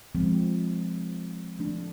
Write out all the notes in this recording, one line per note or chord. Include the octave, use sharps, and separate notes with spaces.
F3 G#3 C4
F3 A3 D4